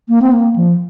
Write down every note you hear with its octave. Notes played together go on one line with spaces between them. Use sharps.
A#3
C4
A#3
F3